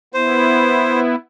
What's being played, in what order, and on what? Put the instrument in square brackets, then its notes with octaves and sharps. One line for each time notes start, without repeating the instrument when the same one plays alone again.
[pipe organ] B3 E4 [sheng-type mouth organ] C5